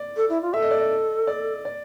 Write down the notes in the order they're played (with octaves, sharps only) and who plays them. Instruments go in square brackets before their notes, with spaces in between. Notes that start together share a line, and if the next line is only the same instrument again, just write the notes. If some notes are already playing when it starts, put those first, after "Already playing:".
Already playing: [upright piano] D5
[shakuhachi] A4
E4
F4
[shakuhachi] A4 [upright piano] E5
[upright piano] D#5
D5
D#5
D5
D5